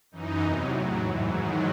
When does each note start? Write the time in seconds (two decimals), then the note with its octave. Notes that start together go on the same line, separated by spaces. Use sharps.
0.11 F#2 E3 D#4
0.41 E2 C3 F#3
0.70 A2 F#3
0.99 G#2 E3 E4
1.28 G#2 D#3 F#3 F#4